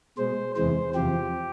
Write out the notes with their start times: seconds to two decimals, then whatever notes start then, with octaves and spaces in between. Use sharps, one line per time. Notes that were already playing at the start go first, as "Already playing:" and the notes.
0.18 B2 G#3 C5
0.56 E2 C3 E3 G#3 C5
0.95 E2 C3 F3 G4